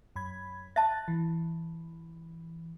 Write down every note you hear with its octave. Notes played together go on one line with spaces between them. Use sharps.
F#2 B5 G#6
E5 A5 F#6 A6
E3